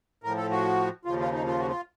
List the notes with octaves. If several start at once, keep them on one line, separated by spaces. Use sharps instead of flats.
A2 F3 A#4
A4
F#4
D#2 C#3 F3 F4
F4
D#4
F4
F#4
F4